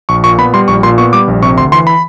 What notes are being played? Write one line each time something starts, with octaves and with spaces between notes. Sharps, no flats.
A#1 C#6
A#2 C#6
B3 B5
G3 C6
A#1 C#6
A#2 C6
B3 C#6
G3 D6
A#1
C3 C#6
D2 C6
E3 C6
B5